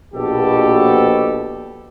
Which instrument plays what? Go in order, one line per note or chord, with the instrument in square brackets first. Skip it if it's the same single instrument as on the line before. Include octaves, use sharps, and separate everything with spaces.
[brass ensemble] A#1 B2 G4 A4